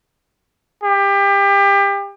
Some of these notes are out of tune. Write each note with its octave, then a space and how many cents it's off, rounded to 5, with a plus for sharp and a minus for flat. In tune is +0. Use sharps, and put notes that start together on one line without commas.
G4 +30